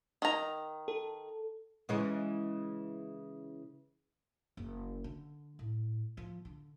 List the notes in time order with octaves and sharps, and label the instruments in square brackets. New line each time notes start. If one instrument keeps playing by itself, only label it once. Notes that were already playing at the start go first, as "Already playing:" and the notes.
[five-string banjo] D#3 A#5
[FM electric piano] A4
[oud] C#3 E3 G#3
[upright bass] F#1
D3
A2
F3
D3